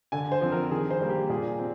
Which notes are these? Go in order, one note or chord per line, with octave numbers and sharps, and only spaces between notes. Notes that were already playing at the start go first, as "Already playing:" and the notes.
D3 G#5
C5
F3 C4
A#4
D#3 G#4
C5
G3 A#3
G4
A#2 G#4
C4